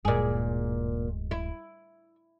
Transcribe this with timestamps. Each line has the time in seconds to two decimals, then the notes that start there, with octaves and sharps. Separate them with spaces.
0.05 D1 G2 A#2 G#3 G#4
1.31 E4